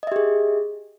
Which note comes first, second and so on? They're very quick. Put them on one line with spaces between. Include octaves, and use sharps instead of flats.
D#5 E5 G4 G#4